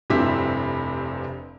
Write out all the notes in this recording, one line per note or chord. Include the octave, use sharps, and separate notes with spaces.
F1 G2 C3 C4 E4 B6